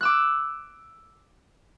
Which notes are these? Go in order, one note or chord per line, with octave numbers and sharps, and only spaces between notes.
D6 E6 F#6